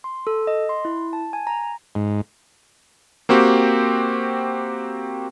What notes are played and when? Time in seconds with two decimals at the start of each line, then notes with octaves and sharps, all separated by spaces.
0.04 C6
0.27 A4
0.47 D#5
0.69 C6
0.85 E4
1.13 A5
1.33 G#5
1.47 A#5
1.95 G#2
3.29 A#3 C4 F#4 G4